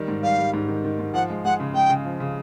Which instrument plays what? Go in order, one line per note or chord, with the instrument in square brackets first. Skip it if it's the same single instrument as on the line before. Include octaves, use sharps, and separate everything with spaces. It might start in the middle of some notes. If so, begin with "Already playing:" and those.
Already playing: [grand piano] D#3 G3
G#2
[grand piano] G3 [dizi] F5
[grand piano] G3
G#2
D#3
D#3
G#2
[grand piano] F3 [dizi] F#5
[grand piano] G#3
[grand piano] G#3 [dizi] F#5
[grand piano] C#3
[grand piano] G#3 [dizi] G5
[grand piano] C#3
F3
C#3